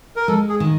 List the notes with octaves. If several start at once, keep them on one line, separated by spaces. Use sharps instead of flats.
A#4
G#3 A4
G#4
D#3